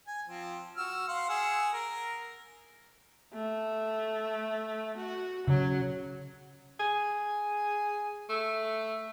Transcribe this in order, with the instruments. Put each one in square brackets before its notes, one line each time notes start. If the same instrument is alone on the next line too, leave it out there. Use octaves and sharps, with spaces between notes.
[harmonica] G#5
F3 C4
F#4 E6 F6
F5 F#5 C6
G#4 F#5 E6
A#4
[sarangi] A3
F#4
[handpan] C#3 [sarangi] F#3
[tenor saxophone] G#4
A3